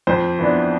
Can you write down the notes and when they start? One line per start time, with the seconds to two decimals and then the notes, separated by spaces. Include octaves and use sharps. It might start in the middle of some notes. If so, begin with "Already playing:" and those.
0.07 F2 C5
0.39 E3 B3 D4